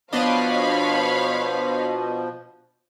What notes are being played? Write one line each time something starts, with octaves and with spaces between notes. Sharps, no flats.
B2 F3 B3 D4 C#5 D#5 F5 B5